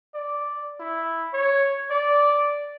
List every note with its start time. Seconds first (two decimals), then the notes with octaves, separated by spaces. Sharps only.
0.14 D5
0.80 E4
1.33 C#5
1.91 D5